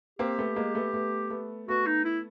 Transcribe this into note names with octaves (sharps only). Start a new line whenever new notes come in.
A#3 C4 G4
A3 B3
G#3 A#3
A3 B3
A3 B3
A3 B3
A3 B3 F#4
D#4
E4